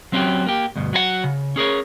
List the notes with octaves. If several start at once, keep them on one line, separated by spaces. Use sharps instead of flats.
F#3 C4 C#4 E4 F#4 G4
A#3 G4
D2 G2 B2
F#3 F#4 B4 F#5
C#3
C#4 G#4 A#4 C#5